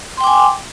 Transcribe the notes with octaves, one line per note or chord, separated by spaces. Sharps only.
G5 G#5 C6 D6